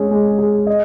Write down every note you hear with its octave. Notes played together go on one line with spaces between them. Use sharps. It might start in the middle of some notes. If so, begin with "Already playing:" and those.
Already playing: G#3 C#4 G#4
G#3
G#4
D#5